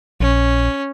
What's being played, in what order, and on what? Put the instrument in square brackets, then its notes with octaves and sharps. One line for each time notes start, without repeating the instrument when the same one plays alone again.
[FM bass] A#1 [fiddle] C#4